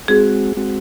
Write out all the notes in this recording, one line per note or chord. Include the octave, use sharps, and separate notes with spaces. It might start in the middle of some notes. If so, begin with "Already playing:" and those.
G#3 C4 F#4 G#4
G#3 C4 F#4